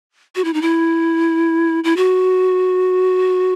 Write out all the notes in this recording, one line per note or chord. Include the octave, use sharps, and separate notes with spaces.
F#4
E4
D#4
E4
E4
F#4